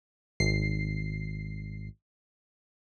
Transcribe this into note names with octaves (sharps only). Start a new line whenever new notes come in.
G#1 C7